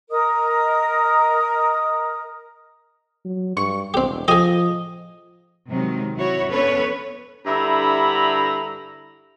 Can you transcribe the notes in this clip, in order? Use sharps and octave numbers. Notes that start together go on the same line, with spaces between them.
A#4 D#5 D#6
F#3
G2 C#6
E1 C4 G4
F3 G4 G#4 D#5
C3 D#3 F#3 G#3
E4 F#4 C#5
B3 C#4 D4 A4 B4 C#5
G2 D3 E4 E5 A#5 B5